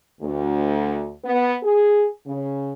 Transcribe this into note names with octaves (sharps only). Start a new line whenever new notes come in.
D2
B3
G#4
C#3